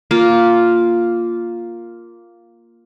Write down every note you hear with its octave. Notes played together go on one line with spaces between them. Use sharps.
A#3 F4